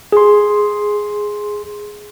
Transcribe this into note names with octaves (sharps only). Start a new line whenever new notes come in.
G#4 C6